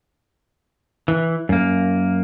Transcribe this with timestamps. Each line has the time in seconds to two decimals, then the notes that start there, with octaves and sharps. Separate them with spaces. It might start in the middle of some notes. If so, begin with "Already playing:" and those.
1.08 E3
1.49 F#2 A#3